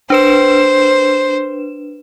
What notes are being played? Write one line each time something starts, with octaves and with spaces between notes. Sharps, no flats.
D4 B4 C5 E7